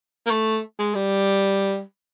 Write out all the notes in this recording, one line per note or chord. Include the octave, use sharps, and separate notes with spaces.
A#3
A3
G#3
G3